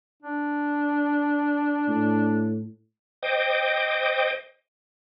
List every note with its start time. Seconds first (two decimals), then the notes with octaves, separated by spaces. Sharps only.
0.22 D4
1.89 A2
3.23 C5 D#5 G5 D6 D#6